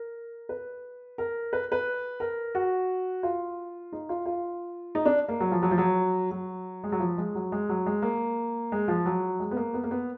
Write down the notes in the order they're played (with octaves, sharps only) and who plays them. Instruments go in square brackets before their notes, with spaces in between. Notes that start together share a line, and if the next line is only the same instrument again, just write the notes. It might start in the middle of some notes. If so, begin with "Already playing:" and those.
Already playing: [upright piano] A#4
B4
A#4
B4
B4
A#4
F#4
F4
D#4
F4
F4
D#4
D4
A#3
F#3
F3
F#3
F3
F#3
F#3
G#3
F#3
F3
G#3
F#3
G#3
F#3
G#3
A#3
G#3
F3
F#3
G#3
B3
A#3
B3
A#3
B3